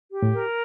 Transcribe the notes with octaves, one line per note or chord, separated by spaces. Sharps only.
G4
A2
A#4